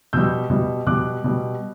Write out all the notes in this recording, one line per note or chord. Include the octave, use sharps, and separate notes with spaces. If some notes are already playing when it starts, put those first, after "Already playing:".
B2 G3 E6 G6
B2 G3
B2 G3 D6 F#6
B2 G3